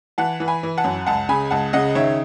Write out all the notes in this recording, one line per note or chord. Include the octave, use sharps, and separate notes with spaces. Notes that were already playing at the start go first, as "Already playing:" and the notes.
E3 F#5 A5
E3
G#5 B5
E3
F#5 A5
F#2
C#2 F#5 A5
C#3 G#5 B5
C#2 F#5 A5
C#3 D#5 F#5
D#3 C#5 E5